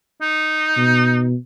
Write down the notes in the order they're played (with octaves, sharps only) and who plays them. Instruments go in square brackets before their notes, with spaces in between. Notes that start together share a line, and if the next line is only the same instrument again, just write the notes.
[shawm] D#4
[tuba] B2